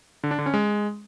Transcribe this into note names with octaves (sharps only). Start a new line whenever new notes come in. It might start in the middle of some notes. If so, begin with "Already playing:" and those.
D3
D4
D3
C#4
G#3